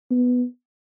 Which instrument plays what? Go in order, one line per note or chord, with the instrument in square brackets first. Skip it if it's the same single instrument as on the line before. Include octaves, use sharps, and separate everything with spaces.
[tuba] B3